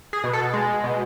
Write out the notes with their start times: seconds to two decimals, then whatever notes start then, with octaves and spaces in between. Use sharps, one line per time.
0.13 G#4
0.24 B2
0.33 A4
0.54 G#3
0.84 B2